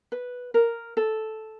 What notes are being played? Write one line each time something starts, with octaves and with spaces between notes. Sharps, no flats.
B4
A#4
A4